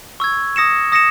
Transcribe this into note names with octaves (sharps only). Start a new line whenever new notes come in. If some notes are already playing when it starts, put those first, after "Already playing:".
C#6 E6 G#6
D#6 A#6 C#7 E7
D#6 A#6 C#7 E7